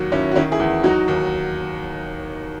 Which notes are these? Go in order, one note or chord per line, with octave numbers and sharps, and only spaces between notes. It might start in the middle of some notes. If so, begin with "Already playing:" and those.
Already playing: D#2 F#3
D#2 C#4 E4
F#4
D#3 C#4 E4
E4 G#4
E2
F#3 D#4 F#4
D#2